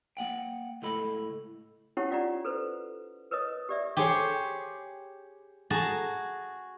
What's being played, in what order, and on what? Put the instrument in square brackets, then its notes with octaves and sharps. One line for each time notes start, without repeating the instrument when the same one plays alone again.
[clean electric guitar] A#3 F#5 G5
C#2 A2 A4 B5
[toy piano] C#4 D#4 E4 G4 C#5 F#5
F4 D5 F#5 A#5
A4 B4 C5
A#4 B4 C#5 D#5 D#6
G4 D5 E5
[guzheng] G4 G#4 C5 C#5
F#4 G#4 A5 A#5